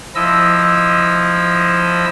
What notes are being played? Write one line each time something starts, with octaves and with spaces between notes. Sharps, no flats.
F3 E4 D#5 E6